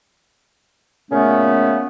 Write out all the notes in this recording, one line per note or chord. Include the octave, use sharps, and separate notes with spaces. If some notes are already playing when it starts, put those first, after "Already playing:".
A#2 C#3 A3 B3 C#4